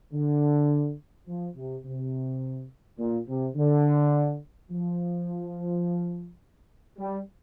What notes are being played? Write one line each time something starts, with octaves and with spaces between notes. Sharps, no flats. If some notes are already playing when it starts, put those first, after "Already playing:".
D3
F3
C3
C3
A#2
C3
D3
F3
G3